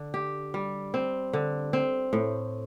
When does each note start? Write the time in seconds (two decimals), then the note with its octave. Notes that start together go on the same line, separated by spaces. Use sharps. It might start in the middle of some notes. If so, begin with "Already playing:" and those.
Already playing: D3
0.14 G4
0.54 G3
0.94 C4
1.33 D3
1.73 C4
2.13 A2